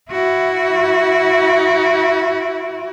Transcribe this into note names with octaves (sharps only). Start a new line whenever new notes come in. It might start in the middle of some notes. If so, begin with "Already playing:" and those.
E4 F#4